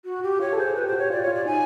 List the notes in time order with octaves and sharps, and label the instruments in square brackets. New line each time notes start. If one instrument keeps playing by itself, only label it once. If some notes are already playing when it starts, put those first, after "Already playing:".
[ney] F#4
G4
[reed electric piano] F4 [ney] C#5
[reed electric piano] A4
[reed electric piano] G#4 [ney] C5
[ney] B4
[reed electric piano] G4 [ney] C5
[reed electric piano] F#4
[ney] C#5
[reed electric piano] F4 [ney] D5
[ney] C#5
[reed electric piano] F4
[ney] D5
[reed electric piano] D#4 [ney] G#5